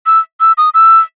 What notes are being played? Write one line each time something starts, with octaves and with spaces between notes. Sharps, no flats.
E6
E6
D#6
E6